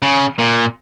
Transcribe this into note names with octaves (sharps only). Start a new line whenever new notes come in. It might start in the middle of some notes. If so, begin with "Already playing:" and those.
C#3
A#2